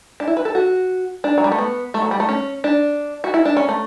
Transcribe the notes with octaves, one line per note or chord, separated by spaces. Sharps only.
D4
E4
B4
A4
F#4
D4
F#3
G3
A3
B3
A3
F#3
G3
A3
C#4
D4
F#4
E4
D4
C#4
A3